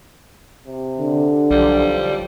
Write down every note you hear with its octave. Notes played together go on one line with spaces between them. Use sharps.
C3
D3
B1 F3 G3